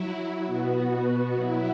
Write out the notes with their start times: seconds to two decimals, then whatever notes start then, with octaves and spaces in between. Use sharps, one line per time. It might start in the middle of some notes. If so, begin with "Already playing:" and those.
Already playing: F#3 E4
0.44 B2 B3 F#4
1.34 F#3 E4